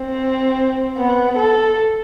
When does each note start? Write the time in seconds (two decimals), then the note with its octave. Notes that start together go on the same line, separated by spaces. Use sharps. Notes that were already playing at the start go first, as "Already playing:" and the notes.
Already playing: C4
0.98 B3
1.38 A4